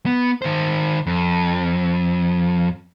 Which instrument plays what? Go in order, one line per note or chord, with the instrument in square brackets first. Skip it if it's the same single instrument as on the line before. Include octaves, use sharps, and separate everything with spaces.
[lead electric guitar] B3
D#3 C5
F2